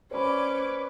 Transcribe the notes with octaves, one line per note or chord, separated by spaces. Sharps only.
C#4 B4 C5 D5 B5 D6